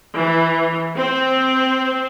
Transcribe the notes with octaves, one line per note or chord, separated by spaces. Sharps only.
E3
C4